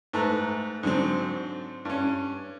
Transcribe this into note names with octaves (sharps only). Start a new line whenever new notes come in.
G#2 A3 B4 A#5
G#2 D3 F#3 C4
G2 C#4